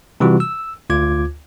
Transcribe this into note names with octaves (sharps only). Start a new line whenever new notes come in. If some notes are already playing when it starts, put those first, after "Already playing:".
C3 E3 G3 F4 F#4
E6
D2 F4 D6 G#6